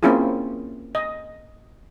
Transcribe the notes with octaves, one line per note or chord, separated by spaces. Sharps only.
A#3 C4 C#4 E4 F4 G#4
D#5